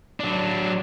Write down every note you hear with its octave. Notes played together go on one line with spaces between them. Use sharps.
F#3 D4